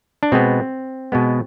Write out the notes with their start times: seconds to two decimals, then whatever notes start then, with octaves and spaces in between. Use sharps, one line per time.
0.23 D4
0.32 B2 G#3 B3 C4
1.12 B2 G#3 B3